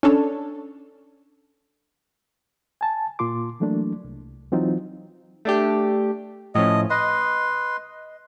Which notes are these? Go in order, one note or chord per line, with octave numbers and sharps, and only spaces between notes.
C#4 D4 A4 C#5
G#5 A5
A#2 A#3 F4 C6 D6
E3 F#3 A3 A#3 D4
C2
E3 F#3 C4 D#4 F4
A3 D4 G4
A2 F3 C#4 D#5
B4 D#5 C6